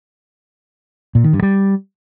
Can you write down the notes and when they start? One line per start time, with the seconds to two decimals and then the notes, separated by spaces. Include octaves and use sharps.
1.15 A#2
1.24 D#3
1.33 G2
1.42 G3